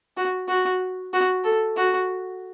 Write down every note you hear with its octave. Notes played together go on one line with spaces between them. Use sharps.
F#4
F#4
F#4
A4
F#4